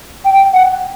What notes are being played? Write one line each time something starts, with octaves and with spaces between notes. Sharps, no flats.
G5
F#5